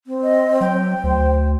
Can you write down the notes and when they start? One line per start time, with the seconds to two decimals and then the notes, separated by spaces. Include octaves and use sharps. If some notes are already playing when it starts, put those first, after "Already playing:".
0.07 C4
0.23 D#5
0.61 F#3 G5
1.04 D2 C5